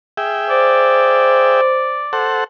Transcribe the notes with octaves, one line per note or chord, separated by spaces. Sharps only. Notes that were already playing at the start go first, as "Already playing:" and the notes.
G#4 E5 G5
C5 D5
A4 C5 F#5